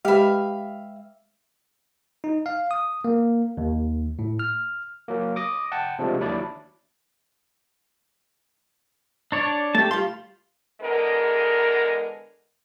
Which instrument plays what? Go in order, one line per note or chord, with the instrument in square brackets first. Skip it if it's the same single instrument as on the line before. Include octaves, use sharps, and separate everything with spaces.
[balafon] G#3 [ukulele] G4 B4 [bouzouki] E5 F5
[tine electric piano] D#4
F5
D#6
A#3
D#2
A2
F6
F#3 A#3
D6 D#6 A#6
F#5 G5 A5
C3 F3 G#3 A3 D4
D#2 F#3 D4 E4 D5
[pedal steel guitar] D4 C#5 D5
[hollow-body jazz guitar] A3 [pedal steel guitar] G4 A5
[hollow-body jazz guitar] G3 C6 [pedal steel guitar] F4
[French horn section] E2 D3 G#3 B3 A#4